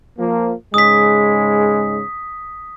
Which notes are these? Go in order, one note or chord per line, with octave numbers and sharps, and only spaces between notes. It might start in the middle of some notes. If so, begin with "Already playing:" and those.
F3 A#3
G#2 C#3 G#3 D#6 B6